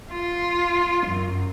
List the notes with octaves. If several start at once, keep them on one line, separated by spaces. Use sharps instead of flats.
F4
F#2